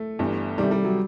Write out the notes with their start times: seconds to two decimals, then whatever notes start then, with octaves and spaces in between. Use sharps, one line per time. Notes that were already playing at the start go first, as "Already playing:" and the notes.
Already playing: A3
0.19 G1 G2 E3
0.58 C3 D#3 G3 A3
0.71 G3
0.84 F#3